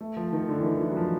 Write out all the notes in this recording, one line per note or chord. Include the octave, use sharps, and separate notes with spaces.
A3
F3
D#3
D3
E3
D#3
E3
F#3
F3